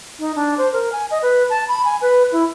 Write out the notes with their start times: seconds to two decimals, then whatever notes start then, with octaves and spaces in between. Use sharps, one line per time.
0.19 D#4
0.36 D4
0.58 C5
0.73 A#4
0.92 G#5
1.11 D#5
1.22 B4
1.50 A5
1.68 B5
1.85 G#5
2.02 B4
2.32 E4